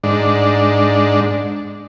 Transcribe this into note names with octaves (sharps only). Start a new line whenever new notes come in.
G#2 D4